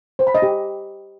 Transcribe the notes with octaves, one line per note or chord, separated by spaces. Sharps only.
C5
B5
D#5
G4